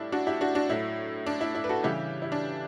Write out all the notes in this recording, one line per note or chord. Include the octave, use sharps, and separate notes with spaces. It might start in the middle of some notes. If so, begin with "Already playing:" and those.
Already playing: A2 G3 D4 E4
D4 F#4
E4 G4
D4 F#4
D4 F#4
A2 F#3 E4
D4
E4
E4
B4
F#4 A4
C#3 E3 G3 E4 G4
E4
D4